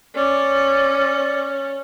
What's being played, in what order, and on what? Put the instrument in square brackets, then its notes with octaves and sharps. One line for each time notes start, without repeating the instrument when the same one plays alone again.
[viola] C#4 [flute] D5